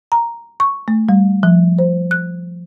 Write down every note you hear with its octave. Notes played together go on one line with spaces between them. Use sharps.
A#5
C#6
A3
G3
F3
C5
F#6